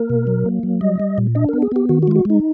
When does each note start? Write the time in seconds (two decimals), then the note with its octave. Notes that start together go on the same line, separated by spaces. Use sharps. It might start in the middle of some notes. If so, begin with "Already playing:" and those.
Already playing: A#3 A#4
0.10 B2
0.27 F#3
0.46 A#3
0.63 F#3
0.81 G3 D#5
1.00 G3
1.18 A#2
1.35 D4 D#5
1.49 A#4
1.53 B3
1.62 G#4
1.72 B3 G4
1.89 D#3 F#4
2.02 F#4
2.07 G#3 F4
2.16 F#4
2.25 G#3 D#4